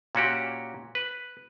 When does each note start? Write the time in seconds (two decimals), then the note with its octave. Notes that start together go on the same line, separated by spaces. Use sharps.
0.15 A#2 C#4 F#4 G4
0.95 B4